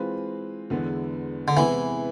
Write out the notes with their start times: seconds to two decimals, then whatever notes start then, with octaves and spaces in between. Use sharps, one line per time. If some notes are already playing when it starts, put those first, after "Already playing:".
Already playing: E3 G#3 C4 F4 B4
0.70 E2 D3 G#3 B3 E4
1.48 D3
1.57 C3 E3 G#3 B3 E4